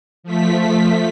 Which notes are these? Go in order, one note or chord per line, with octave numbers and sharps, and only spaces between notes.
F3 A3 B6